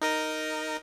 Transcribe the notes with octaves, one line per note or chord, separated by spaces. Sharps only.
D#4 A#4 D#5